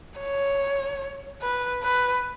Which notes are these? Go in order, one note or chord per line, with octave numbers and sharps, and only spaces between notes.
C#5
B4
B4